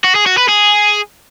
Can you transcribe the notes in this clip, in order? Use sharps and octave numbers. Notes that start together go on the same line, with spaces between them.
F#4
G#4
F#4
B4
G#4